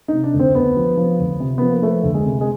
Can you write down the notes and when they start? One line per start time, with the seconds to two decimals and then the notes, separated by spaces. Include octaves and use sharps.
0.08 C3 D#4
0.24 D4
0.34 D2
0.39 C4
0.55 D2 B3
0.77 F3
0.97 F3
1.19 D2
1.40 C3
1.58 F3 B3
1.71 A#3
1.82 F3 A3
2.03 D2
2.14 G#3
2.25 C3
2.41 G#3